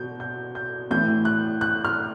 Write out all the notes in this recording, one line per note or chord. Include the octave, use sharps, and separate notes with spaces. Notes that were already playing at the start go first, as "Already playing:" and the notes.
Already playing: B2 G6
G6
G6
A2 E3 G6
F#6
F#6
F6